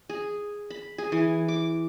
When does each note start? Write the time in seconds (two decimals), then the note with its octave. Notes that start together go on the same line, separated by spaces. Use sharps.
0.10 G#4
0.70 B5
0.98 G#4
1.12 E3
1.48 D6